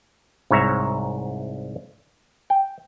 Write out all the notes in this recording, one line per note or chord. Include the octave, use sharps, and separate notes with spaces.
C2 G#2 C#5 E5 A#5
G5